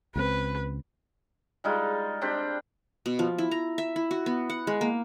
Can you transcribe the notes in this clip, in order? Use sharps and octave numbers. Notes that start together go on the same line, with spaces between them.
C#2 G3 C4 B4
G3 G#3 D#4 F4
C4 D4 G4 C5
B2
F3
E4
A#5
E5
E4
F#4
B3
F#5
G#3
A#3